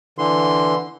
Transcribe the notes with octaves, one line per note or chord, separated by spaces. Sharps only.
D3 E3 C6